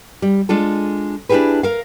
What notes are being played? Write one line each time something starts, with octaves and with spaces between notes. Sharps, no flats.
G3
G#3 D4 F4 A4
D4 E4 F4 G4 G#4 B4
A#4 F5